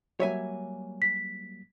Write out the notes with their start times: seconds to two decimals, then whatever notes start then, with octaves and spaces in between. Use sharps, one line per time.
0.20 F#3 G3 A#3 C#5 E5 G#5
1.02 B6